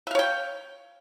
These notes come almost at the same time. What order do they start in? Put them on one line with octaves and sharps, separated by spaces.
E5 F5 C#5 G5